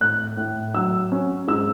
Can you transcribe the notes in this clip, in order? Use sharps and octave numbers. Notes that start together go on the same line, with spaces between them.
A2 F#6
A2
F#3 E6
C#4
G#2 E6